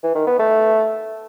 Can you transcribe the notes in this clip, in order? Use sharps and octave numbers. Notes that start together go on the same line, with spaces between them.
E3
D#3
B3
A3